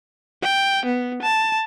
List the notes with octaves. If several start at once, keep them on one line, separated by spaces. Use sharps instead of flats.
G5
B3
A5